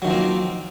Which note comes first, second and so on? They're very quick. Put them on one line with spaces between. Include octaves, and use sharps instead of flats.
F#3 D#3 F3 C4 A#3